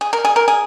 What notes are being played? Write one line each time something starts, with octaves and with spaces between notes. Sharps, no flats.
G#4
A#4
G#4
A#4
G#4